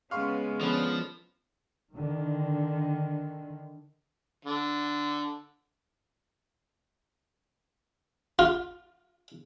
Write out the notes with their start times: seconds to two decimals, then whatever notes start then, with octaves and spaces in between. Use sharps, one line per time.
0.11 C#3 G#3 B3 C#4 F5 C6 C#6
0.61 D3 F3 B3 C#4 A4
1.92 D3 D#3
4.45 D3
8.39 F4